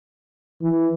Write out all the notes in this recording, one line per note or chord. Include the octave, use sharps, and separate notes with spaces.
E3